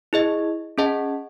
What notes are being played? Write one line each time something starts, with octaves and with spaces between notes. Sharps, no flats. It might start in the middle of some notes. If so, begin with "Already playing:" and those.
E4 G#4 D#5
C#4 G#4 D#5 F#5 A5